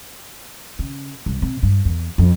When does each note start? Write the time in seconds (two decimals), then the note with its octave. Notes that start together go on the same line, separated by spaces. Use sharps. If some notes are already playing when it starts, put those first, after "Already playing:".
0.79 C#3
1.26 C2
1.42 C3
1.63 G2
1.85 E2
2.18 F2